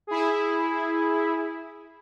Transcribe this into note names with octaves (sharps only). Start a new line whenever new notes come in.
E4 G#4